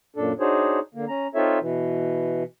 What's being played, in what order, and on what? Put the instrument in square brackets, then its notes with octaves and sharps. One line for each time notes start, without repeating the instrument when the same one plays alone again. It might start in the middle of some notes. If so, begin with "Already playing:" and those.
[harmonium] F#2 A#2 D4 A4
D4 D#4 F#4 G#4 C5 C#5
D3 A#3
C#4 A#5
C4 D#4 F4 A4 C#5 E5
B2 E3